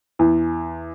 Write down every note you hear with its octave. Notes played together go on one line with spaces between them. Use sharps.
E2